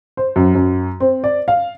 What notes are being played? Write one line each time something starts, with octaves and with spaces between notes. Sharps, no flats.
C5
F#2
F#2
C4
D5
F5